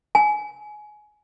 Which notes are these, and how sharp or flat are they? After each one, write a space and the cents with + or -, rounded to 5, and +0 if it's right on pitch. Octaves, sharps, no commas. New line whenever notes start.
G#5 +15